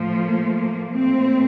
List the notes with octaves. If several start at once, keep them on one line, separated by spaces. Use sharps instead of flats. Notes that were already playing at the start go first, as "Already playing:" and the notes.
Already playing: A2 F3 A3
A#3
A#3
A#2 A3 C4